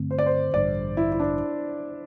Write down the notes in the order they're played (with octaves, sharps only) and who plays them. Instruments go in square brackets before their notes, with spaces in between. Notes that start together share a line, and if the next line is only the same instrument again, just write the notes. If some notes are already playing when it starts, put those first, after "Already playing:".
Already playing: [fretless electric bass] G2 D3 A3 C4
[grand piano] C5
D5
C5
[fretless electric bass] A1 G2 D3 [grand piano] D5
[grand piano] E4
E4
D4